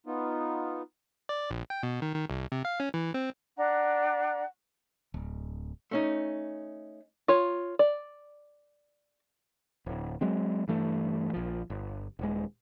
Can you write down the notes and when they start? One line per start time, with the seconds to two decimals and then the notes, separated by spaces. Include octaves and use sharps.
0.07 B3 D#4 F4
1.29 D5
1.50 A#1
1.70 G5
1.83 B2
2.02 D#3
2.15 D#3
2.30 C2
2.52 C3
2.65 F5
2.80 C#4
2.94 E3
3.14 C4
3.58 D4 D5 F#5 A#5
5.14 D1
5.91 A3 C#4 D#4
7.28 F4 C#5
7.79 D5
9.86 D1
10.21 F#3 G#3 C4
10.68 G2 E3 A3
11.33 A#1 F3
11.70 G1
12.19 D#1 G#3